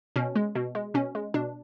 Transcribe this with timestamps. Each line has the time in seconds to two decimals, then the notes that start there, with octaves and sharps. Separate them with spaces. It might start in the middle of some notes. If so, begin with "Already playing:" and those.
0.16 B2 C#4
0.36 G#3
0.55 B2
0.75 G#3
0.94 B2 C#4
1.15 G#3
1.34 B2 D4